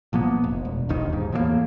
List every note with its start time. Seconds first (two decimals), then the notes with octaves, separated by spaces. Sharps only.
0.13 A#1 F3 A#3 B3
0.44 F1
0.65 E1
0.89 E1 A#1 D#2 D#3
1.09 D#2 G#2
1.32 E2 A2 F#3 A#3